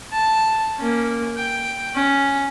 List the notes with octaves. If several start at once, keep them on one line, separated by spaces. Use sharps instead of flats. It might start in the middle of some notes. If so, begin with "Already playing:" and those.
A5
A#3 C#4
G5
C#4